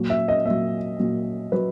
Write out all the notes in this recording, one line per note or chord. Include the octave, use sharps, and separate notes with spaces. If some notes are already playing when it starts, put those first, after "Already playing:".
Already playing: A#2 F#3
E5
D#5
A#2 F#3 E5
A#2 F#3
F#3 B4